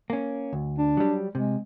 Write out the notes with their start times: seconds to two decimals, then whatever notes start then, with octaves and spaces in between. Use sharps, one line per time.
0.10 A#3 C#4
0.53 D2
0.78 D4
0.97 F#3 G3
1.35 C3 G#3